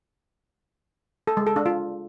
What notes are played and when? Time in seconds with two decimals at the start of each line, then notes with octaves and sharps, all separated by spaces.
1.27 A4
1.37 G#3
1.47 A4
1.56 D4
1.66 F4